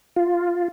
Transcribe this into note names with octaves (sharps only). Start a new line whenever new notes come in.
F4